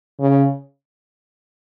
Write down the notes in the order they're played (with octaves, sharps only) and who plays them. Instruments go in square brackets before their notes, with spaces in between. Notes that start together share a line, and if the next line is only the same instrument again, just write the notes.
[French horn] C#3